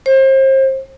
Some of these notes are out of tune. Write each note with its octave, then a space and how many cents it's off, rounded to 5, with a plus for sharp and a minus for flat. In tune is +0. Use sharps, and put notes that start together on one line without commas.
C5 +35